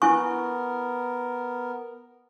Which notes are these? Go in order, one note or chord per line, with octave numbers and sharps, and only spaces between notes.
B3 E4 A#4 G#5 C#6